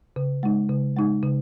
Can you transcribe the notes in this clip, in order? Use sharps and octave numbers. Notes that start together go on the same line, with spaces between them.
C#3
G#3 D#4
C#3
G#3 D#4
C#3